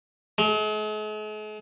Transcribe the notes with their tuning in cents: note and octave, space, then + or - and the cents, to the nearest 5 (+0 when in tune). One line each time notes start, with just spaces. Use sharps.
G#3 +45